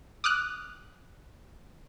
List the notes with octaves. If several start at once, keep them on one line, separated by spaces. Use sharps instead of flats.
D6 D#6 F6 F#6